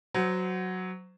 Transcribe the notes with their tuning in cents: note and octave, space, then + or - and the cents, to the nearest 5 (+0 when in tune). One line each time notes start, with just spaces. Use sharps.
F#3 +0 C5 -25